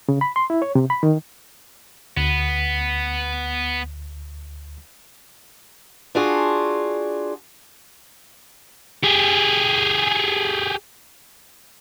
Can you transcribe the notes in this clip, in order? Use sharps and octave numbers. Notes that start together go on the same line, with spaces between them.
C#3
B5
C6
E4
C#5
C3
B5
D#3
D2 B3
D4 F4 F#4 G#4
G4 G#4